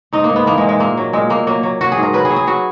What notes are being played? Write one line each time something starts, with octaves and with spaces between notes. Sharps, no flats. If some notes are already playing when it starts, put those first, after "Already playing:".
G#2 D#4
A#3
G#2
B3
E3 A#3
G#3
G#2
G#3
A#2 A#3
F#3
A#2 G#3
A#2 A#3
F#3 A#3
F#3
F#3 F#4
G#4
G#2
A#4
F#3 B4
G#4
F#3
G#4
F#3 F#4